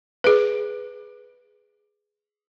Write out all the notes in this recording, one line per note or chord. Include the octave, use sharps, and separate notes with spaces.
G#4 B4